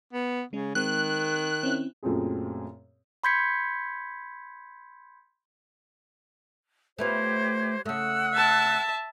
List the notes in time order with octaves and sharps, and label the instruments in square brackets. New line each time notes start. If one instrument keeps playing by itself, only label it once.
[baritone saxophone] B3
[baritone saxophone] C#3 [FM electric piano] G#3 C#4
[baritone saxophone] D#3 [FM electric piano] G#3 C4 [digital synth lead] F#6
[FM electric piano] C4 C#4 E4
[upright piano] F#2 A#2 A3 C4 G#4
[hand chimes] B5 C6 G6 G#6 B6 C#7
[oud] A3 B3 F4 [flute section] G4 C5 C#5
[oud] C#3 A3 [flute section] F#5 E6 F#6
[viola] E5 A5